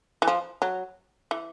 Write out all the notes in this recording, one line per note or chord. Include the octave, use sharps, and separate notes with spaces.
E3
F3
F#3
E3